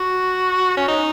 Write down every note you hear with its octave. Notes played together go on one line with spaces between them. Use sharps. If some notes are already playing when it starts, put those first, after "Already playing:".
Already playing: F#4
C#4
D#4